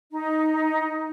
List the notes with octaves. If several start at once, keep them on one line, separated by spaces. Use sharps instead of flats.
D#4